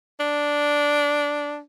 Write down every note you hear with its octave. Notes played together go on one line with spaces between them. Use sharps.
D4